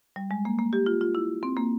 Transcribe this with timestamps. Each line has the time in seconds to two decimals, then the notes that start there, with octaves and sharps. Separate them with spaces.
0.16 G3
0.31 G#3
0.45 A#3
0.59 A#3
0.73 G4
0.86 F4
1.01 F4
1.15 E4
1.43 C4
1.57 A#3